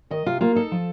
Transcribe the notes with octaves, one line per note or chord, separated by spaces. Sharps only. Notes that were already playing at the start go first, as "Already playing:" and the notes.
D#3 D#5
C3 F4
A#3 F4
D#4 A4
F3